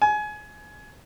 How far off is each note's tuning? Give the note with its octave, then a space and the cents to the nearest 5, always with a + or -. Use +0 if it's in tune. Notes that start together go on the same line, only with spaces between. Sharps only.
G#5 +25